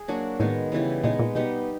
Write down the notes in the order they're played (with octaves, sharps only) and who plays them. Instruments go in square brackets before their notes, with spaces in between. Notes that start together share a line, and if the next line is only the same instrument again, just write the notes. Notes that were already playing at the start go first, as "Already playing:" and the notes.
Already playing: [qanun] G#4
F#3 A#3 D4 F#4
[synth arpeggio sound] A2 [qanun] D#3 G#3 B3
[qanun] C#3 E3 G3 B3
[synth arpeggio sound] A#2 [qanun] G#3 B3 D#4
[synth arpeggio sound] A#2
[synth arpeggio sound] B2 [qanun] G3 B3 D#4 G4